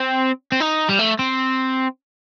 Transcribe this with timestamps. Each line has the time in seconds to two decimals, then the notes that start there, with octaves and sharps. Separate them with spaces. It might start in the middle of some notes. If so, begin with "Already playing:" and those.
Already playing: C4
0.52 C4
0.60 D#4
0.89 G3
0.99 A3
1.19 C4